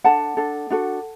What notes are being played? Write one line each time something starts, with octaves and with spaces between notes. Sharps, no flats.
D4 A4 F#5 A5
D4 A4
D4 F#4 A4